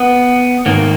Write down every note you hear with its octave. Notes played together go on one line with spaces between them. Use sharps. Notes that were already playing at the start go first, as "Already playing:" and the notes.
Already playing: B3
G#2 D#3 A#3